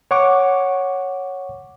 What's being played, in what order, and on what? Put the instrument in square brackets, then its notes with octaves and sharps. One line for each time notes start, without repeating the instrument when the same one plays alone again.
[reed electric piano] C#5 F#5 C#6 D6